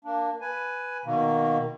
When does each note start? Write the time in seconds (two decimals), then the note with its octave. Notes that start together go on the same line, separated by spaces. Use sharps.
0.05 A#3 D4
0.41 B4 G#5
1.05 B2 D#3 A#3